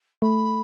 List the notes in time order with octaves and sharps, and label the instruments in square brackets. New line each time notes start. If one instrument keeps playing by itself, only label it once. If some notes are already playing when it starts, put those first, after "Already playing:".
[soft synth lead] A3 [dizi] B5